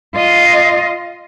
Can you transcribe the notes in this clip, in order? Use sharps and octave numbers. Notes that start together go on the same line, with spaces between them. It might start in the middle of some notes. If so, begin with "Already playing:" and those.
F4 D#5